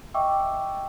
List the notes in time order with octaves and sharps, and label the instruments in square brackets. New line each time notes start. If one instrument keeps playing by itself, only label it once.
[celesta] D#5 E5 G5 C#6 D6 E6